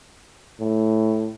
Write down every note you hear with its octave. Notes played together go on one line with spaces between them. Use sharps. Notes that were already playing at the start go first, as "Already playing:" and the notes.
A2